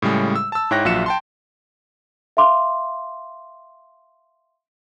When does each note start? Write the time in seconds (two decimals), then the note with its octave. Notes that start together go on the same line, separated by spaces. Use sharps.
0.02 A2 C#3 G3 G#3
0.36 E6
0.52 A5 E6
0.71 G#2 E4 C#5 G5 F#6 A#6
0.85 A#1 F#3 F4 E5 C#7 E7
1.06 G5 A5 C6
2.37 E5 F5 C6 D6